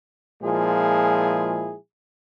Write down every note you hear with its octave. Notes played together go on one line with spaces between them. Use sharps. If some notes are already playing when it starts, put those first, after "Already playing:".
A#2 F3 G#3 E4 G#4